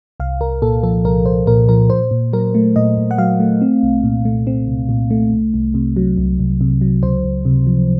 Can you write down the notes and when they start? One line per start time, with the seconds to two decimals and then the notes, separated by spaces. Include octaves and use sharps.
0.20 C2 F5
0.41 C2 A#4
0.62 A#2 A4
0.83 F3 A4
1.05 C2 A#4
1.26 C2 C5
1.47 A#2 A#4
1.69 F3 A#4
1.90 A#2 C5
2.11 A#2
2.33 F#3 A#4
2.54 A3
2.76 A#2 D#5
2.97 A#2
3.11 F#5
3.18 F#3 F5
3.40 A3
3.61 C4
3.83 C2
4.03 A#2
4.25 A3
4.47 C4
4.67 C2
4.89 A#2
5.11 A3
5.32 C2
5.54 C2
5.74 C3
5.96 F#3
6.17 C2
6.39 C2
6.61 C3
6.81 F#3
7.03 C#2 C5
7.24 C#2
7.45 C3
7.66 F3